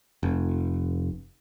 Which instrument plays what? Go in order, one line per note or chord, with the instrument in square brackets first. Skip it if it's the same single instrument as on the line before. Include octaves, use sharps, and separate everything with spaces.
[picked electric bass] F1